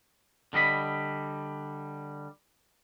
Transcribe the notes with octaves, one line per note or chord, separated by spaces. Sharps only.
D3 G3 D#5 B5